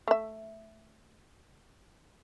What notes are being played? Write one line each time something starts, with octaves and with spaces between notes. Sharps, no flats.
A3 E5